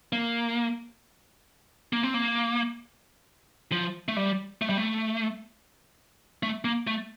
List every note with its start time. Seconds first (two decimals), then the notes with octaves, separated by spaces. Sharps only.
0.12 A#3
1.93 A#3
2.03 C4
2.14 A#3
3.72 F3
4.08 A3
4.17 G3
4.62 A3
4.69 G3
4.77 A3
6.43 A3
6.64 A#3
6.87 A3